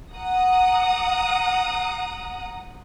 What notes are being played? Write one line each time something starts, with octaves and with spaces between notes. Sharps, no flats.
F#5 A#5 D#6